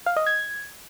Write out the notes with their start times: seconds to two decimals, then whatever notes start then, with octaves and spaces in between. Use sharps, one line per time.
0.06 F5
0.16 D#5
0.26 G#6